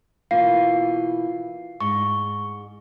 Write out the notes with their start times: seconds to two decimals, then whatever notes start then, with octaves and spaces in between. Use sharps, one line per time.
0.31 B2 E3 A#3 F4 F5 C7
1.81 G#2 C#6